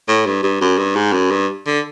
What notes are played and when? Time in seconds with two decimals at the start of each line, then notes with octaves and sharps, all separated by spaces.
0.08 A2
0.26 G2
0.43 G2
0.61 F#2
0.78 G2
0.96 G#2
1.13 F#2
1.31 G2
1.66 D3